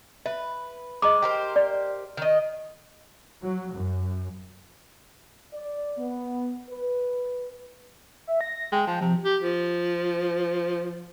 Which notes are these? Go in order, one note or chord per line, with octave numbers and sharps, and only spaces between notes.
B4 E5
G#3 D#5 A#5 D6
G4 A#4 C5
D5
D#3 D#5
F#3
F#2
D5
B3
B4
E5
A#6
G#3 G5
F3
C3 F3
G4
F3